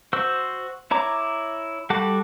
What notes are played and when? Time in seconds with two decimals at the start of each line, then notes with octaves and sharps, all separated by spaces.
0.13 F#4 C5 E6
0.91 E4 C#5 A#5 D6
1.90 G3 F#4 A4 F#5 D6